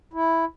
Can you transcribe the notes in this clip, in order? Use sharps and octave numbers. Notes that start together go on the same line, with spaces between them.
E4